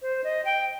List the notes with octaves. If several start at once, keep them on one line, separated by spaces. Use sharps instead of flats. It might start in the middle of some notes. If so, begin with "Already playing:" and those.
C5
D#5
G5